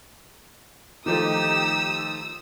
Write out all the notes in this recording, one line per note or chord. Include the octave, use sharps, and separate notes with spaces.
D#3 F3 A3 D#4 G4 D#6 E6